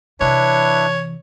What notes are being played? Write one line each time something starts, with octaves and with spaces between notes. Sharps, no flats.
C3 E3 D4 E4 B4 C#5